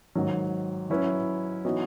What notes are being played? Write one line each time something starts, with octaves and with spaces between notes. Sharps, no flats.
G#2 D#3 F#3
F#3 C#4 E4 B4
E3 B3 D#4 F#4 C#5